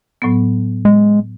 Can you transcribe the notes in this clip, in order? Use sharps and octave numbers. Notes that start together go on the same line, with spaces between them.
A2 F#3 B3
G#3